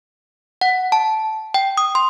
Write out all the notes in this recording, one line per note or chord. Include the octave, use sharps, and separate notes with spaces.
F#5
A5
G5
D#6
C6